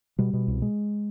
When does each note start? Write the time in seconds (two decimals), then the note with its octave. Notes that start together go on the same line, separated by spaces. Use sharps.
0.19 B2 G3
0.33 B2
0.48 C2
0.62 G#3